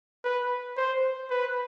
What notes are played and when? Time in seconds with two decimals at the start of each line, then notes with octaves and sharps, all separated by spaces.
0.24 B4
0.77 C5
1.30 B4